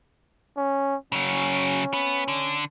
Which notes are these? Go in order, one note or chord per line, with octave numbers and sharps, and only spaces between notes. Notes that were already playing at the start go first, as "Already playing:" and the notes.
C#4
C#3 F#3 C#4
B3
D3